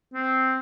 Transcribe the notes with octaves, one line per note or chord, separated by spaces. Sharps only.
C4